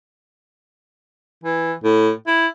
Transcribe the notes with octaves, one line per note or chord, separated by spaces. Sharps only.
E3
A2
E4